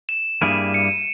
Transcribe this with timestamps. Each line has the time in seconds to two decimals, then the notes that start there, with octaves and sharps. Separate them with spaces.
0.09 E7
0.41 G2 G3 A#3 E4 G#4 D#7
0.74 C#7